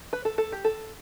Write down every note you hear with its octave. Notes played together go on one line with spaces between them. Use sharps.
B4
A4
A4
G4
A4